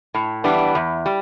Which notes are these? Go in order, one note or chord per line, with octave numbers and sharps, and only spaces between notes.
A2
E3 G3 B3 D4
E2
G3